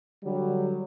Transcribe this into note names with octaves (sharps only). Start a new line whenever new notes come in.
D3 F#3 G3